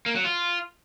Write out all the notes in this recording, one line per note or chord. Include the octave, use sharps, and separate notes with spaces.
A#3
F#3
F4